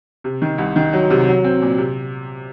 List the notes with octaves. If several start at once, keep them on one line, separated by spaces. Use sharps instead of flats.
C3
D#3
C2
D#3
F#3
C3
F#3
C4
A#2
C3